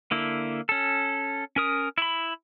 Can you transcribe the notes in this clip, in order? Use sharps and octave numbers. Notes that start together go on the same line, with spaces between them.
D3 A#3 E4
C#4 A4
C#4 A#4 D#6
E4 B5